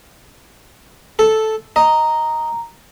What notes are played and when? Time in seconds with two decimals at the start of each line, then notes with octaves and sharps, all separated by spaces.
1.19 A4
1.76 D#5 A#5